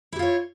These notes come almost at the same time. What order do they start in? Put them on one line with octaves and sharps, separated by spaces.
E4 G4 F4 C#5